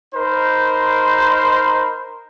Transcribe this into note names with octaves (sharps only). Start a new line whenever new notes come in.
D#4 A#4 C5 B5 C6